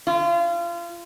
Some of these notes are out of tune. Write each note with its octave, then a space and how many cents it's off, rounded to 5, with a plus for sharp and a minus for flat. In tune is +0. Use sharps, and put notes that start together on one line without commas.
F4 -30